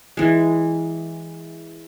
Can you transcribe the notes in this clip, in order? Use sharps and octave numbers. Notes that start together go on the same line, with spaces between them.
E3 G#3